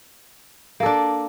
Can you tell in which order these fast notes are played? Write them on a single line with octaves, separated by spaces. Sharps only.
A#3 A4 D4